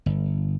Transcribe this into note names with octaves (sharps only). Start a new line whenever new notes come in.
G1